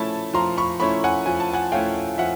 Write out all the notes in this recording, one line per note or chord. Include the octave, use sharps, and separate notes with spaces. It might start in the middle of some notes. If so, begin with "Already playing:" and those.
Already playing: F3 A3 C#4 E4 A5 B5
F3 A#5 C6
B5 C#6
A3 C#4 E4 B5 C#6
F#5 G#5
F3 G#5
A5
F#5 G#5
A3 C#4 E4 F5 G5
F3 E5 F#5